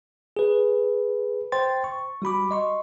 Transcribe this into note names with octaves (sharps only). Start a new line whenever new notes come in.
G#4 B4
C5 G5 C6 A6
C#6
G3 F#4 B5 D6
D#5 C6 C#6